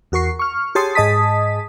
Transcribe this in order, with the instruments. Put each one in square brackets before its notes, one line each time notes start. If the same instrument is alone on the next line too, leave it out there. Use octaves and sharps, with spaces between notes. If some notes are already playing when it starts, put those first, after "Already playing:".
[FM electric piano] E2 F#4 A#4 C#6 C7
C#6 F6
G4 G#4 C#5 A5 C6 D#6
G#2 G#4 D#5 A5 D#6 B6